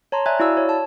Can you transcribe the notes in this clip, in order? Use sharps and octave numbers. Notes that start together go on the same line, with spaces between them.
C#5 A5 A#5 C6
D5 E5 G#5 A#5 F#6 G#6
E4 F#4 D5 F5 E6
C#5
A5